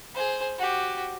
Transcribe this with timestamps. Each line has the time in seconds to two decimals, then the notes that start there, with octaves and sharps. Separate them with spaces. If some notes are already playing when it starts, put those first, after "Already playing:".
0.15 G#4 C5
0.58 F#4 G4